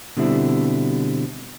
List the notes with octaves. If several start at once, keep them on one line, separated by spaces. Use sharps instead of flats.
B2 D3 G3 C4 E4